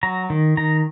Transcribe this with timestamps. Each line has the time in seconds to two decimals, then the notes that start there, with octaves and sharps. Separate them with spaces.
0.03 F#3 A#5
0.30 D#3
0.57 D#3 A#5